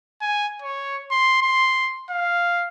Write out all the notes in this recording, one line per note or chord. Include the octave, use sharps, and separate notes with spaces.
G#5
C#5
C6
C6
F5